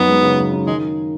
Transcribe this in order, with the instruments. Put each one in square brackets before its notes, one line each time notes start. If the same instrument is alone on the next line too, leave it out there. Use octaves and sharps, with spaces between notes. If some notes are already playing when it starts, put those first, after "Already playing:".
Already playing: [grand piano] F#2 D#4 [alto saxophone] B3
[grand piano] G#3
C#3
F#2
D#4
[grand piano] D#3 [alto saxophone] G#3